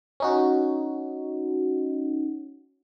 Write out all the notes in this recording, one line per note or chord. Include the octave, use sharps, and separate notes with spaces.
C#4 D#4 F#4